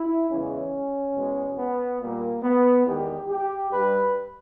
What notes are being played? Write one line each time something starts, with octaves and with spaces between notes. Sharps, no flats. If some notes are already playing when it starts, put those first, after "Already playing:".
Already playing: E4
E2 C#3 E3 G#3 C#4
E2 B2 G#3
B3
A#2 G3 A#3
B3
E2 D#3 G#3 G4
G4
G2 G3 B4